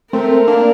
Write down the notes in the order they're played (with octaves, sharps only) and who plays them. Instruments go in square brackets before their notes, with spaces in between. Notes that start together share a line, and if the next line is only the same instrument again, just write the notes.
[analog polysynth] A3 C4 [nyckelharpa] A#4
[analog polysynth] A#3 D4